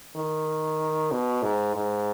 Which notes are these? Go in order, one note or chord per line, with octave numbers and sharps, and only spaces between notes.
D#3
B2
G#2
G#2